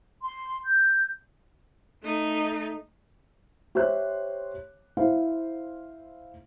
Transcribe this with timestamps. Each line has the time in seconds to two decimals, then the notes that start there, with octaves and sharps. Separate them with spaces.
0.22 C6
0.67 G6
2.02 A3 D#4
3.75 G4 C5 C#5 E5 F#6
4.97 E4 C5 E5 F5